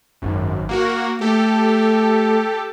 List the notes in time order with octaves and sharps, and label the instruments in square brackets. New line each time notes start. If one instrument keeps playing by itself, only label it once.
[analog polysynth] G#1 F#2
A#3 F#4 A#4
[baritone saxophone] A3 [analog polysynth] G4 A4